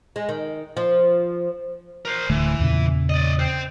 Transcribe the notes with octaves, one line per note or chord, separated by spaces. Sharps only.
G#3
D#3
F3
A#4 C5
D1 D3 E3 A3
E2 A#2 C#3
D5 D#5
C5 G5